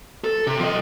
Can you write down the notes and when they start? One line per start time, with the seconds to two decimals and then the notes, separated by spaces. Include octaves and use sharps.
0.24 A4
0.47 C3
0.59 F3 D#5